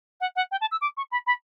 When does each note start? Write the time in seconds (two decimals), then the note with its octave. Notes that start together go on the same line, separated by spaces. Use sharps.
0.21 F#5
0.36 F#5
0.51 G5
0.61 A5
0.71 E6
0.81 D6
0.97 C#6
1.12 B5
1.27 B5